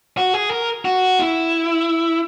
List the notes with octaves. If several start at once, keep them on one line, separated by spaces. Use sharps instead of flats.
F#4
G#4
A#4
F#4
E4